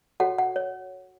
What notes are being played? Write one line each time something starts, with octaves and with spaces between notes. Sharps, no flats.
F#4 A4 C#5 F#5
F#5
C#5